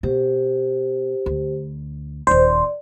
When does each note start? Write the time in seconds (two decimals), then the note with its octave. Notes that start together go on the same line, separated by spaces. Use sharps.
0.03 B2 G4 C5
1.26 D2
2.27 D#1 D#4 C5 D5